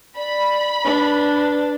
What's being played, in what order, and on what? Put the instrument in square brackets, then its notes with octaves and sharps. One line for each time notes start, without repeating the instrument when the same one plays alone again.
[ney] D5 [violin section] B5
[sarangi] D4 [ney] B4